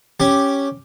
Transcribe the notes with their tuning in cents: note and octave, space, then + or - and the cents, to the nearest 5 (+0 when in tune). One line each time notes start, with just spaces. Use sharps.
C#4 +0 G4 +0